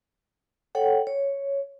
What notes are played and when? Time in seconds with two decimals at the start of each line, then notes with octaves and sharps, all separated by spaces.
0.75 A4 C#5 F#5 G5
1.07 C#5